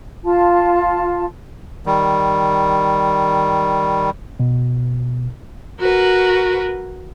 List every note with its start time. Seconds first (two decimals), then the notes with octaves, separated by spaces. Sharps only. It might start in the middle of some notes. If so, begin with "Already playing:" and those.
0.24 F4 A5
1.86 D#3 G3
4.40 B2
5.81 F#4 A#4 B4